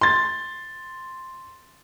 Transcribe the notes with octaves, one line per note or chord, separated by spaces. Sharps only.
C6 A6